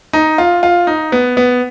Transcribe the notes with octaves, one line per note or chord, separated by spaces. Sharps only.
D#4
F4
F4
D#4
B3
B3